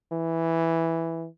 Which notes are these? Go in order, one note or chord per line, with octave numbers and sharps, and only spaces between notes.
E3